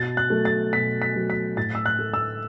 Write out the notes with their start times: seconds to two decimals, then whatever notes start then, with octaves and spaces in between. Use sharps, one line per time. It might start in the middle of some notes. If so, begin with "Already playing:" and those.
Already playing: B2 A6
0.17 F#6
0.30 F#3 A3
0.45 A6
0.72 B2 B6
1.02 B6
1.15 F#3 A3
1.30 B6
1.57 A2 A6
1.75 E6
1.86 F#6
1.99 A3
2.14 E6